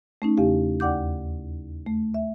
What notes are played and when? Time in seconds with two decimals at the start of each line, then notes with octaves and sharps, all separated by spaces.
0.22 A3 C#4 D#4
0.37 E2 C#3 G4 F5
0.80 D#2 D5 F#5 D6 G6
1.86 A3
2.14 E5